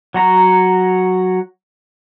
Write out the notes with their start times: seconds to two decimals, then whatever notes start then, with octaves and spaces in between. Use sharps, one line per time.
0.14 F#3 F#4 A#5